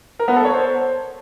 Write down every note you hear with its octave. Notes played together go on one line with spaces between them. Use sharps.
A#4
B3
A4
C#5
C5